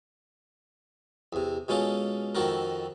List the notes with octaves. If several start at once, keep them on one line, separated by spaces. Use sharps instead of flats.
E2 C3
B2 G#3 C#4 F4 A4
F2 D#3 C4 F#4 A4 A#4